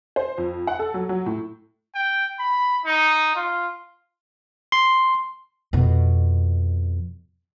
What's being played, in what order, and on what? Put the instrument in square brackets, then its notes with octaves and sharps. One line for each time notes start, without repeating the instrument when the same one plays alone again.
[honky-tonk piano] C5
F2
F#5
A4
F#3
F#3
A2
[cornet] G5
B5
D#4
F4
[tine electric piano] C6
[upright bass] F2 B2